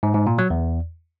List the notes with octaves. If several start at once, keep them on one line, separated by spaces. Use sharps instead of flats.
G#2
G#2
A#2
F#3
E2